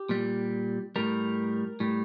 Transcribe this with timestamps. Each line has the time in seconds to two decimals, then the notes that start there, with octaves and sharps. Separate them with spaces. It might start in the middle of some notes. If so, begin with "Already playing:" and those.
Already playing: G4
0.09 A#2 G3
0.96 A2 G3 A#4
1.80 A2 G3